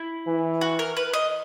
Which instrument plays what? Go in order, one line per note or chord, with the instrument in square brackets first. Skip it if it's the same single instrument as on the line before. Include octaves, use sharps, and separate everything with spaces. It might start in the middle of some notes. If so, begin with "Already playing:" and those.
Already playing: [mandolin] E4
[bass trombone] E3
[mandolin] F#4
A#4
B4
D#5